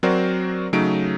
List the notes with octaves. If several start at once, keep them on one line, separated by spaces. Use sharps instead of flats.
F#3 C4 F#4 A#4 C5 D5
C#3 F#3 A3 D#4 D7